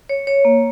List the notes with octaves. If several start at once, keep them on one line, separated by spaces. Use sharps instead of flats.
C#5
C#5
A#3